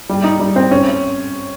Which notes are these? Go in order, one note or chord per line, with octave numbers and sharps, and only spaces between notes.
G3
D#4
G3
C4
C#4